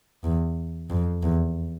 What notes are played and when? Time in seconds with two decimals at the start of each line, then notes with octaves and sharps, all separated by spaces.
0.24 E2
0.90 F2
1.23 E2